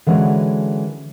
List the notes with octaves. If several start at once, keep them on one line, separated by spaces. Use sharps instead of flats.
D3 E3 G#3 C#4 F#4 C#5